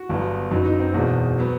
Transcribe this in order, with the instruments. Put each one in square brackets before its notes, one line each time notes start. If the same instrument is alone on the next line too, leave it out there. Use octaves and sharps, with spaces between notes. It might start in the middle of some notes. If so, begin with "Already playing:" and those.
Already playing: [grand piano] F#4
G1 G2 F#3 B3
F#2 F#3 B3 D#4
D#4
C4
E1 E2 B2
F#3 B3